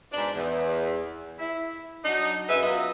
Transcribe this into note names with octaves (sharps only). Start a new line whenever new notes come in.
G#2 B2 D4
E2
E4
F#3 D4 D#4
F#2 G#4 B4 E5
F#3 B3 F4 B4 D#5